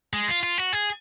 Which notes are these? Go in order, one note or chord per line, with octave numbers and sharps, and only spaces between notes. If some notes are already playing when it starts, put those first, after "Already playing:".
G#3
F4
F4
F#4
G#4